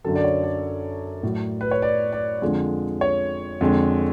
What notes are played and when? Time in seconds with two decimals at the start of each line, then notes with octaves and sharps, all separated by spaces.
0.04 F#2 D3 F#3 A4
0.16 D5
0.24 C#5
0.44 D5
1.23 A2 F#3
1.61 B4
1.71 C#5
1.82 D5
2.12 D5
2.42 F2 D3 F3 G#3
3.01 C#5
3.61 F2 D3 G#3